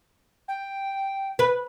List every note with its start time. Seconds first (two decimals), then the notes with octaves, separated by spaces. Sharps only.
0.48 G5
1.39 B4